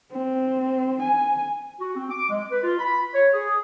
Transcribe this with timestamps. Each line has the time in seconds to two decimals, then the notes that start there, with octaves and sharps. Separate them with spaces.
0.12 C4
1.02 G#5
1.81 F#4
1.96 C4
2.10 D6
2.30 G#3
2.51 B4
2.63 F4
2.80 B5
3.14 C#5
3.33 G#4